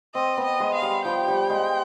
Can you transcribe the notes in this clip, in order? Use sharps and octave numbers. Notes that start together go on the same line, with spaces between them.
C4 D#5
B3
D#5
G#3
F5
G3
F3 G5
G3
G#3